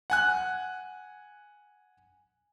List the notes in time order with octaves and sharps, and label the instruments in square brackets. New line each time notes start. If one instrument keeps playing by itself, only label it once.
[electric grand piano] F#5 G#5 F#6